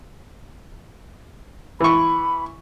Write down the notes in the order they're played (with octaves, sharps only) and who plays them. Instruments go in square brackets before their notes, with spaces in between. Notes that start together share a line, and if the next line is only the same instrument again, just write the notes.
[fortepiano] E3 C#6 [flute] B5